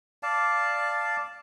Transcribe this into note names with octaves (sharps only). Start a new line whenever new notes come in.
D5 F5 A5